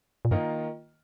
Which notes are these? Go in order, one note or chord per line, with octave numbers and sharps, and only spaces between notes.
A#2
G2 D#3 A#3 F4 A#4 D#5